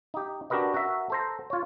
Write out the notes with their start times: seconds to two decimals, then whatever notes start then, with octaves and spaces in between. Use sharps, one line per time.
0.14 D#4 G4
0.50 D4 F#4 G4 A#4 B4 D#5
0.74 F#4 A#4 E5
1.10 A4 C5 A#5
1.50 F4 C#5